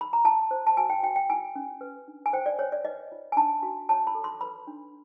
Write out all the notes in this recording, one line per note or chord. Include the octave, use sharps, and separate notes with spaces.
B5
A#5
F4 A5
C5
A5
F#4 G#5
G5
F#4 G5
G5
E4 G#5
C#4
B4
D4
G#5
C5 G5
D5
C5 C#5
D5
B4 D#5
F4
G#5
D4 A5
F#4
C#5 A5
B5
A4
C6
B4 B5
D4